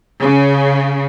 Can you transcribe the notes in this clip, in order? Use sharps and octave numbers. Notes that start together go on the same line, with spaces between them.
C#3